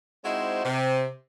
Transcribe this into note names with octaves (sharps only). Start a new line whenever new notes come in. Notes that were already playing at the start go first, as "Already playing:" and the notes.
G#3 C4 D#4 E4 F#4 C5
C3